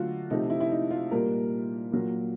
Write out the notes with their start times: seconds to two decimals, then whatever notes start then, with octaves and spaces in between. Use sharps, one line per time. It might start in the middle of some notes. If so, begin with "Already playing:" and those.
Already playing: D3 F#3 A3 F4 F#4
0.30 C3 F3 A3 D#4
0.50 E4
0.60 E4
0.71 D#4
0.91 F4
1.11 A#2 G3 A#3 A#4
1.92 A#2 F#3 A#3